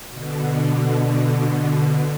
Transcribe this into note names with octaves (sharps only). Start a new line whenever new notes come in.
B2 D3